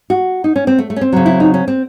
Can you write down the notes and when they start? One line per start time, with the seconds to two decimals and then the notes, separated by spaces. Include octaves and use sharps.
0.10 F#4
0.44 D#4
0.56 C#4
0.67 C4
0.78 A3
0.90 A3
0.96 C#4
1.01 C4
1.12 C#3 F#3
1.26 E4
1.40 D#4
1.54 C#4
1.68 C4